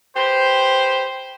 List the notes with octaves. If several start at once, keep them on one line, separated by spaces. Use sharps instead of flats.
G4 B4 C5